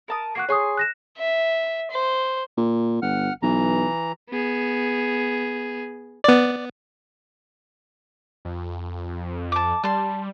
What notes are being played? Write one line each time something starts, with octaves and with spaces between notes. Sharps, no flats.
A#4 A5 D#6
A#3 F#4 F#6 C7
G#4 C#5 C6 C#6 D#6
F#6 A#6 E7
E5
C5
A#2
G1 F#5 F6
B1 E3 A#5
B3 G#4
B3 D5
F2
A5 D6
G3 A5 C6